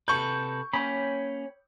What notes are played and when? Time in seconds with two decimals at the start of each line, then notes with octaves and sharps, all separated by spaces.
0.08 C3 A4 B4 C#6 G6
0.74 A#3 C#4 C#5 G5 B5